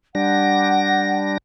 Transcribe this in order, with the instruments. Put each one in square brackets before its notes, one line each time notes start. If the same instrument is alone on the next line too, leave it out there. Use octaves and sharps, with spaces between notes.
[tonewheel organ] G3 D4 A#6 [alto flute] F#5